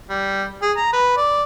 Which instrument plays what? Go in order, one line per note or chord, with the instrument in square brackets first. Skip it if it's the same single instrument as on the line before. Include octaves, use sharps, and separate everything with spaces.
[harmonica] G3
G#4
A#5
B4
D5